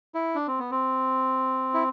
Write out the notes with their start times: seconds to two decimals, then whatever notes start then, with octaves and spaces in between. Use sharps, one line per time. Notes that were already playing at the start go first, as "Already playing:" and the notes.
0.15 E4
0.35 D4
0.48 C4
0.59 B3
0.71 C4
1.74 E4